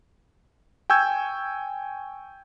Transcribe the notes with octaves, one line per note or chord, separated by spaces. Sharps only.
G5 G#5 C#6 E6 G6 G#6